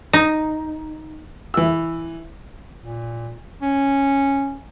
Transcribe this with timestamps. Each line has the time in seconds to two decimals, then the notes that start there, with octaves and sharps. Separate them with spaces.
0.13 D#4
1.54 E3 E6
2.80 A#2
3.62 C#4